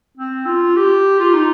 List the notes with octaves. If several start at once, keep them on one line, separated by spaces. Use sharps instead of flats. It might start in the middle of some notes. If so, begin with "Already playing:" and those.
C4
F4
G4
F4
D#4